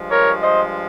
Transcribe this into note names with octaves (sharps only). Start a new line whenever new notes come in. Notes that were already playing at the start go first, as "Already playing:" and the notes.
Already playing: G2 F3 G#3
A#4 C#5
C5 D#5